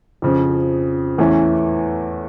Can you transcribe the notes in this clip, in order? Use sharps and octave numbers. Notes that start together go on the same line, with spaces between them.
F2 C#3 F3
E2 E3 A3 C#4